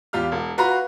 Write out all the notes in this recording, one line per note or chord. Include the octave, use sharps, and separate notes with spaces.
E2 F4 G4 F6
E1
F4 F#4 B4 F5 A#5 C6